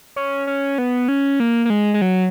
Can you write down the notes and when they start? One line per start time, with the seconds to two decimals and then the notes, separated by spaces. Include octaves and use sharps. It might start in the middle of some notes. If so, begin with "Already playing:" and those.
0.16 C#4
0.47 C#4
0.78 B3
1.08 C#4
1.40 A#3
1.65 A#3
1.70 G#3
1.94 G#3
2.02 F#3